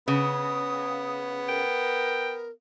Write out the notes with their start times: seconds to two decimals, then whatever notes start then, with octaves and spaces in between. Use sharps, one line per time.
0.08 C#3 B3 D#6
1.49 A#4 G5